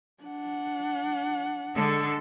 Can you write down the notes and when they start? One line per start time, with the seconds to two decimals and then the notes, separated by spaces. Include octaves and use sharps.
0.23 D4 F#5
1.75 D3 G#3 A4